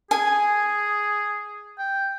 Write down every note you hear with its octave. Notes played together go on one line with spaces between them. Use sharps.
G#4 G#5
G5